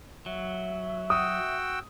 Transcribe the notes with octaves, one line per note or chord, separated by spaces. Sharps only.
F#3 E5
F#4 G5 D#6 E6